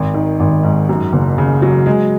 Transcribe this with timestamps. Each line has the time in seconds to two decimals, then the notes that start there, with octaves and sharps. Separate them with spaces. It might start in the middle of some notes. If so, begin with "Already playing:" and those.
Already playing: G#1
0.14 D#3
0.40 G#1
0.63 G#2
0.89 F#2
1.12 F#1
1.38 C#3
1.62 F#3
1.86 G#3